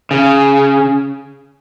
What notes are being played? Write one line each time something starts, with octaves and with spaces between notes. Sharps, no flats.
C#3